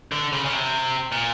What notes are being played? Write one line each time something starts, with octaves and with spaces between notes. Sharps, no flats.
D3
C#3
C#3
C3
A#2